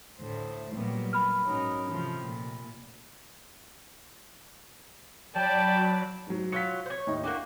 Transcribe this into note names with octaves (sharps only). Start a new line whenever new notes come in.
D2 A2 C5
A#2 F#3 G3 A#3 B3
B5 F6
G#2 F#3 C#4 D#4 A#4
C3 E3 F3 A3
A#2
F#3 D5 G5 A5 B5
G#2 F#3
F#3 F4 B6 C#7
C5 C#5
D#2 A2 D#4
A#3 D4 F#4 G4